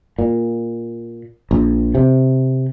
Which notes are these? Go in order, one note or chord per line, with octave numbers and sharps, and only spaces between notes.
A#2
A#1
C3